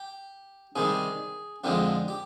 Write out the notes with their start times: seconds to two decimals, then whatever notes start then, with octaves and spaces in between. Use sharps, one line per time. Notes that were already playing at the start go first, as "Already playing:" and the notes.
Already playing: G4
0.76 C3 D#3 G3 G#4
1.64 F2 D3 F3 G#3 G4
2.08 G4